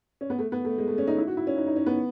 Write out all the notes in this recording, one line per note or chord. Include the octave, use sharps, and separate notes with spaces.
C#4
B3
A3
B3
A3
G#3
A3
C#4
D#4
E4
F#4
E4
C#4
D#4
D#4
C#4
B3